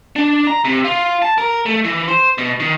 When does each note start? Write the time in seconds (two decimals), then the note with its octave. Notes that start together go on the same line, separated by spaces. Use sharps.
0.16 D4
0.47 A#5
0.65 C3
0.84 F4
1.22 A5
1.38 A#4
1.66 A3
1.84 E3
2.08 C5
2.38 B2
2.60 D#3